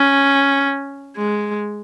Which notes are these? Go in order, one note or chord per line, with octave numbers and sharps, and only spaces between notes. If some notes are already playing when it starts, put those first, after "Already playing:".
Already playing: C#4
G#3